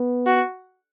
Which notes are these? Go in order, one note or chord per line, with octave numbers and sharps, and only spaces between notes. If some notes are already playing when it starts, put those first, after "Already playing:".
Already playing: B3
F#4